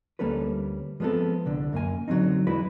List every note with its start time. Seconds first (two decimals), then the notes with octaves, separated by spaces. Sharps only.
0.19 D2 G3 A#3 C#4 A4 B4
1.00 F3 G#3 B3 C4 A4
1.46 C2 D3
1.73 F#2 A#3 G#5
2.08 D3 F#3 A#3 C4 D#4
2.47 E2 G#3 E4 F#4 B4 B5